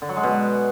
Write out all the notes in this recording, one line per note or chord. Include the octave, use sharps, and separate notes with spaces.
D3
F#3
G#3
B2